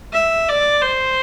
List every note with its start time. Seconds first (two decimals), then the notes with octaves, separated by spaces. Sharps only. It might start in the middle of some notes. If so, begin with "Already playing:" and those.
0.13 E5
0.49 D5
0.82 C5